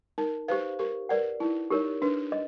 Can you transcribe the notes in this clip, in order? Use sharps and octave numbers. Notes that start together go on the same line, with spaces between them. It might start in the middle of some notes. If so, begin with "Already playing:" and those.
D#4 A#4
G4 B4 C5 F5
G4 A#4
A#4 B4 D5 F#5
D#4 E4
D#4 G4 A#4 C#5
D4 B4
D#5